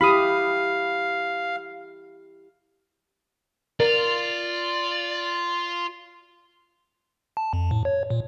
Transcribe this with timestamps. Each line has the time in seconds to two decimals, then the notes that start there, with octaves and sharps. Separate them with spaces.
0.01 E4 G4 F5 B5 D#6
3.80 F4 A#4 D5
7.37 A5
7.53 F2
7.71 A2
7.85 C#5
8.10 A#2